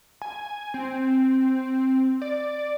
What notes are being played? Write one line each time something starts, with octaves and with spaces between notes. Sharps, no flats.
G#5
C4
D5